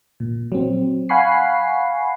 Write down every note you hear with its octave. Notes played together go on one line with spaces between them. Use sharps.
A#2
F#3 C4
F5 F#5 G#5 B5 C#6 C7